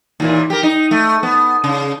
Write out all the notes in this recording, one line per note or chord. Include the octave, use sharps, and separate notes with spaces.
D#2 A#2 E3
G4 A#4
D#4
A3
B3
C#3